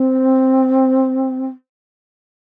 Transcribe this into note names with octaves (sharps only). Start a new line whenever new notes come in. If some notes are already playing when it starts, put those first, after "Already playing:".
Already playing: C4